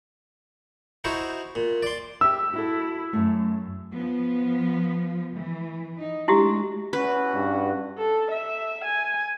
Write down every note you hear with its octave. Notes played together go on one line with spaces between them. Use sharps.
D#4 E4 F#4 C5
A#2
D5 C6
G4 E5 E6
E4 F#4 A4
F#2 A3
F3 B3
E3
D#4
G#3 A3 D4 E4 F#4 G4
E2 C#4 F#4 B4
G2
A4
E5
G#5